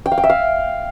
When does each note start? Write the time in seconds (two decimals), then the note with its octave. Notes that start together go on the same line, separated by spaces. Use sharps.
0.06 G5
0.12 F5
0.18 G5
0.24 E5
0.30 F5